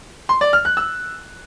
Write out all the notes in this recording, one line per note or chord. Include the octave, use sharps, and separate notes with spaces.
C6
D5
F6
F#6
E6